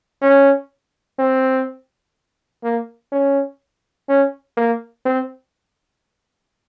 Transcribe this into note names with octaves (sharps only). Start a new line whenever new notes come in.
C#4
C4
A#3
C#4
C#4
A#3
C4